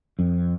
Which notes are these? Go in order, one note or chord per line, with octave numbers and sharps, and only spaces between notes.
F2